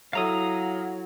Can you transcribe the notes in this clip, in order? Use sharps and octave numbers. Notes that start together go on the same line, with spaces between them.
F#3 E4 A4 E5 F5 A#5 D#6